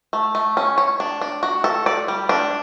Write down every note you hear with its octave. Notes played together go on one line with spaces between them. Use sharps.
A3
A3
C#4
C#5
D4
D4
F#4
A4
D5
G3
D4